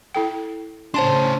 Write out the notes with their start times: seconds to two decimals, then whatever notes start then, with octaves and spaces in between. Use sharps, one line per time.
0.15 E4 A4 G5
0.94 A2 C#3 C#4 D4 C5 C#5 A5 C6